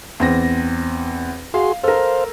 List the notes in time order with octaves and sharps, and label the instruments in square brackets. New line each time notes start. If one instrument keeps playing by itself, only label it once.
[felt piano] E2 C4 A#6
[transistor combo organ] F#4 G#4 C6 [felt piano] F5
[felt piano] A4 A#4 [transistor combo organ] C5 F5